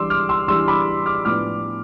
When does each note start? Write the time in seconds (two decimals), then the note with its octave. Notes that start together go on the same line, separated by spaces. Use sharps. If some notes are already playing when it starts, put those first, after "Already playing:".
Already playing: E3 G3 D4 C6 D6 E6
0.10 D6 F6
0.29 C6 E6
0.48 E3 G3 D4 C6 E6
0.67 B5 D6
1.06 D6 F6
1.25 A2 F3 B3 D4 D6 F6